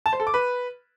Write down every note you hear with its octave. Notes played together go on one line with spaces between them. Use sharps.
A5
C5
A4
D6
B4